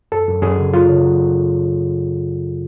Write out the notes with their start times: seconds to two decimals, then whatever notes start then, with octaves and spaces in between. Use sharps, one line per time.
0.12 F#2 A4
0.28 F#2
0.42 F#2 G#4
0.58 C#3
0.73 F#3 F4
0.89 C#3
1.04 F#3
1.20 F#3